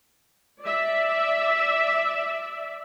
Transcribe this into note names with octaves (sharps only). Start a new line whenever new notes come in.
D5 E5